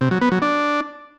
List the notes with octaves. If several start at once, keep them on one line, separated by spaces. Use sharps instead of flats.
C3
F#3
B3
F#3
D4